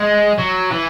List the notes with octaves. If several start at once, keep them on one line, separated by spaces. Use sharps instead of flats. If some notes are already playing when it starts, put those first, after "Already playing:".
Already playing: G#3
F#3
E3